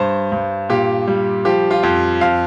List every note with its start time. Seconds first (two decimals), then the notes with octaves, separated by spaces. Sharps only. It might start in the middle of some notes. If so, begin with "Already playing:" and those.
Already playing: G2 C5
0.32 G2
0.69 A#2 G4
1.08 G3
1.45 F3 G4
1.71 F4
1.83 F2
2.21 F2 F5